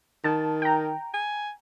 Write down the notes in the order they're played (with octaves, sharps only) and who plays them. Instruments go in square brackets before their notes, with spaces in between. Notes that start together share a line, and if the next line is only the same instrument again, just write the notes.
[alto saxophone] D#3 [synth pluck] A5
[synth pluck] G5 A#5
[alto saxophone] G#5